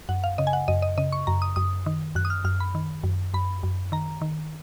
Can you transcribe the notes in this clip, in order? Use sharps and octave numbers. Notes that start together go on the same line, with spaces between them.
F#2 F#5
F5
C#3 D#5
G#5
F#5
F#2 D#5
D#5
C#3 D#5
C#6
F#2 A#5
D#6
F#2 D#6
D#3
F#2 F#6
D#6
F6
F#2 F6
B5
D#3
F#2
F#2 B5
F#2
D#3 A#5
D#3